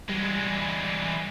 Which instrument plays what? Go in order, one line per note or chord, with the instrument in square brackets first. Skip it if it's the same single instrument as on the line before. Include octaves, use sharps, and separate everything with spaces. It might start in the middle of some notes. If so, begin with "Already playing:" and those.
[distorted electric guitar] E3 G#3 [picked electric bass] G3